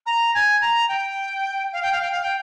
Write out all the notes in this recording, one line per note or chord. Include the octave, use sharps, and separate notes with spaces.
A#5
G#5
A#5
G5
F5
G5
F5
G5
F5
G5